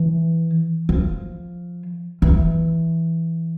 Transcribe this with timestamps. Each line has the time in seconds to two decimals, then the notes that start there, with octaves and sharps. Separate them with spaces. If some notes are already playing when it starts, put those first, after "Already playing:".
Already playing: E3
0.89 F3
2.22 E3